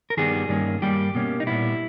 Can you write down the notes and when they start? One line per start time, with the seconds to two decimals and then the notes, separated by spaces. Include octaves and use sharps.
0.10 A#4
0.17 G2 D#3 G3 B3 G#4
0.49 G2 D#3 A#3 C#4
0.82 G2 G3 A#3 G4
1.15 B2 A#3 C#4
1.40 D#4
1.47 A#2 G3 B3 E4